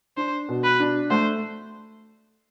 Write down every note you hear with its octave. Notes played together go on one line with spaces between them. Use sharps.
D4 C5
B2
B4
D4
A3 C5